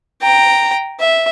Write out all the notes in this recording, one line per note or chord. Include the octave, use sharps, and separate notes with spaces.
G5 A#5
E5